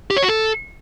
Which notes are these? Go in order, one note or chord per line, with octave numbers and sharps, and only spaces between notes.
G4
C#5
F#4
A4